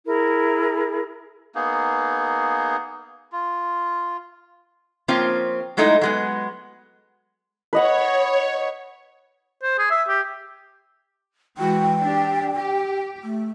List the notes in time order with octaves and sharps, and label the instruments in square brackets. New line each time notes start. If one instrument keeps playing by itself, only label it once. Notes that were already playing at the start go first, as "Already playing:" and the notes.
[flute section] E4 G#4 A#4
[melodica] A#3 B3 D#4 G#4
F4
[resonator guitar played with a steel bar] F3 A#3 C4 C#4 F4
F#3 G#3 A3 D#4 E4
F#3 G#3 B3
[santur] B4 D#5 F#5 [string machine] C#5
[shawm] C5
G#4
E5
G4
[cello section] E3 G#3 F#4 [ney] G5
[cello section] D4 G4
G4
[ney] A3